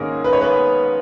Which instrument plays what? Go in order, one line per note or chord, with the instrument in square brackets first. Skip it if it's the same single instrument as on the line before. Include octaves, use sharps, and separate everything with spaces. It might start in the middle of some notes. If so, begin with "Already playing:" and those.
Already playing: [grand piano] G#2 D#3 A#3 C#4 G#4 A#4
B4
C#5
B3 B4